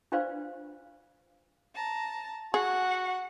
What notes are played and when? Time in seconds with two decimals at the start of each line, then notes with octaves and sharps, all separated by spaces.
0.12 D4 F4 B4 C5 D5 F5
1.75 A5 A#5
2.54 F#4 G#4 F#5